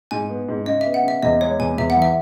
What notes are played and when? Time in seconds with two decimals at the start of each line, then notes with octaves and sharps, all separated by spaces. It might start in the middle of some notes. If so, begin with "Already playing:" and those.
0.11 G#2 G#5
0.29 B3
0.48 G#2
0.66 C#3 D#5
0.81 E5
0.86 B3
0.94 F#5
1.03 C#3 E5
1.23 E2 D#5
1.41 G#3 C#5
1.59 E2 G#5
1.78 E2 E5
1.90 F#5
1.97 E3
2.02 E5